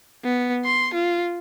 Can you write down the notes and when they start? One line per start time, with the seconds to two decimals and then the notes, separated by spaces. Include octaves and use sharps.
0.24 B3
0.65 C6
0.94 F4